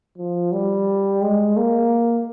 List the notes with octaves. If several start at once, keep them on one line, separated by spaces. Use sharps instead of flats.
F3
G3
G#3
A#3